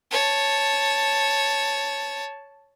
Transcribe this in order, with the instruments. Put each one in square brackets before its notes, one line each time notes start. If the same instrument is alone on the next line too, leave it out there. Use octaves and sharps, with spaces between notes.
[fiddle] C#5 A5